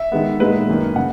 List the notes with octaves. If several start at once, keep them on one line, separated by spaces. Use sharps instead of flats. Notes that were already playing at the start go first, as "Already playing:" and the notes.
Already playing: E5
D#3 G#3 B3
A#2 G#3 B3 D#4 B4
F#2 D#3 A#3
C#3 F#5